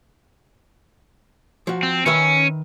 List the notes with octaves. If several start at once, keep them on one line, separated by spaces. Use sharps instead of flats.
F3 F#4
C4
D#3 C#4 B4 E5